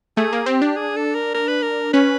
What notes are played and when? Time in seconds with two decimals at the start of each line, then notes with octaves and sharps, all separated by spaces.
0.17 A3 G#4
0.33 A#3
0.46 C4 G4
0.62 D4
0.76 G#4
0.96 A4
1.15 A#4
1.34 A#4
1.48 B4
1.62 A#4
1.93 C#4 B4